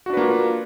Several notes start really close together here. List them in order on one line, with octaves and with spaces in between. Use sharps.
F#4 D4 B4 A#3 F4